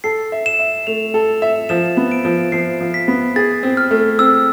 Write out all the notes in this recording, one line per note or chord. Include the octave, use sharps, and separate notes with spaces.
A4 C7
E5
E7
E5
A3 F7
A4
E5
F3 E7
B3
D7
F3
F3 C7
F3
B6
B3
G#4 A6
C4
F6
A3
C4 E6